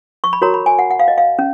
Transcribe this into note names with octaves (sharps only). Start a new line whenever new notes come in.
C#6
B5
F#4 A#4 C#5 A#5
B5
G#5
F#5
F#5
F5
D#5
F5
C#4